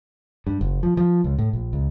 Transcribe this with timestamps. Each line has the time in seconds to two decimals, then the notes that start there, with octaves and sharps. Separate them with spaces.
0.47 G2
0.61 F#1
0.83 F3
0.97 F3
1.24 C#2
1.38 A2
1.53 A#1
1.73 C#2